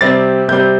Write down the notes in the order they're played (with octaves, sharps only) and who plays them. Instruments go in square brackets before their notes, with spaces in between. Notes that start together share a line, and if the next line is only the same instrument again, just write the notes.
[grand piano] C3 G3 C4 A6
C3 G3 C4 G6